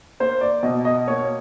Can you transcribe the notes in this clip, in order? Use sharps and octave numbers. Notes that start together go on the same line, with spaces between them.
A#3 C5
D5
B2 D#5
D#5
A#3 C#5